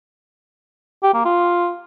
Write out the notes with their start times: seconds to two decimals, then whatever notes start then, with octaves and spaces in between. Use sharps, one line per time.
1.03 G4
1.14 A#3
1.25 F4